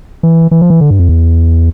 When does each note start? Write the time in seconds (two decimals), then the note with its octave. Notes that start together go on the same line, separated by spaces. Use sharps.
0.23 E3
0.51 E3
0.62 F3
0.70 E3
0.81 D3
0.90 G2
0.99 F2
1.09 E2